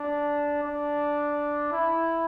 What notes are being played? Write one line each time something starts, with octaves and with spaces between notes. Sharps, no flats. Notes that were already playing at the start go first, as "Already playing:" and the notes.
Already playing: D4
D4
E4